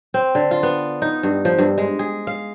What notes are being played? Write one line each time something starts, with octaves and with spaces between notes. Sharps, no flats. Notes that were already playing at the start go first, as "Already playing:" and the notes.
C4
D3
F4
B3
D#4
G2
F3
G2
G#3
G#4
F5